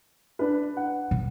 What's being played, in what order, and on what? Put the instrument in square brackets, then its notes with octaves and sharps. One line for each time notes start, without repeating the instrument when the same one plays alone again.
[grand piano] D4 B4
F#5
[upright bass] B2